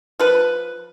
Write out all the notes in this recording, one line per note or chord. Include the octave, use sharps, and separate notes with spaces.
F3 B4